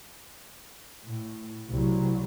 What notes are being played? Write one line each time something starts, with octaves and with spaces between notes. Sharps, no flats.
A2
C2 F#3